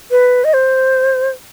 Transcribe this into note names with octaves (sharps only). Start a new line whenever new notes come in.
B4
D#5
C5